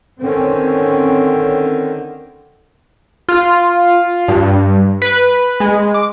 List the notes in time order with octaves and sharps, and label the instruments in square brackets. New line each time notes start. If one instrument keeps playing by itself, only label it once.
[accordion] D3 D#3 [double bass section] C4 C#4
[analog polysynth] F4
G2
B4
G#3
D6